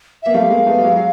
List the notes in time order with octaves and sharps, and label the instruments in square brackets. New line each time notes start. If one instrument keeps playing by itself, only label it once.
[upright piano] A#3 [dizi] E5
[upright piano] G3 A3 [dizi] F5
[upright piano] G#3 A#3
A3 B3
G3
F#3 G#3
F#3